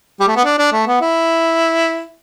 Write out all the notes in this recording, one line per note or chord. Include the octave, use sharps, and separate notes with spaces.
G3
A3
B3
D4
D4
A3
B3
E4